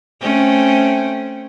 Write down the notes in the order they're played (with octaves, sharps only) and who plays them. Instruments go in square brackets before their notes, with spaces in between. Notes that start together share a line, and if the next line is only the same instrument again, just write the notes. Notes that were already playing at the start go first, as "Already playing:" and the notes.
[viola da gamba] A3 C4 C#4